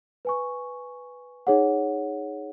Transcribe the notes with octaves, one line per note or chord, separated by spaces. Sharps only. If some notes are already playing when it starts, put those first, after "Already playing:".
B4 G#5 C#6
D#4 G#4 C#5 F#5